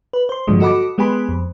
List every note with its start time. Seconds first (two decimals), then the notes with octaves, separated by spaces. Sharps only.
0.13 B4
0.29 C5 C6
0.48 G2 A#2 D3 F3 F#3 G#3
0.60 F#4 A4 D#5 F#5 B5 D6
0.98 G#3 B3 G4 G#5 B5 C6
1.29 F2